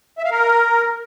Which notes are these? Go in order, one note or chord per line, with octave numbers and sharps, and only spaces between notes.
E5
F5
A#4